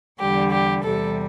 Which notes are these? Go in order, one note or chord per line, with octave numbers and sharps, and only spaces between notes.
E2 D3 G3 G4
G4
E2 C3 G3 A4